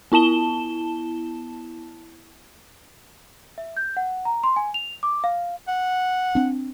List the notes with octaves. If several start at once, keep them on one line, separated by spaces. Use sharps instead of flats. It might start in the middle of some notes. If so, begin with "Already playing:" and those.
B3 E4 A5 E7 G7
E5
G6
F#5
A#5
C6
G#5
F7
D6
F5
F#5
C4 D4